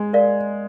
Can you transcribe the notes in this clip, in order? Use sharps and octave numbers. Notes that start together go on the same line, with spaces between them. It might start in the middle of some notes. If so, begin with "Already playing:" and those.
Already playing: G#3
A#4 D5 F5